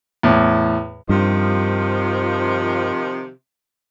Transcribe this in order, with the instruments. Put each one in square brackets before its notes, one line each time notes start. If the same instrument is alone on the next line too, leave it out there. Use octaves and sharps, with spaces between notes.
[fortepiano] E2 A2
[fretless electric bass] G2 [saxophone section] C3 D#3 F3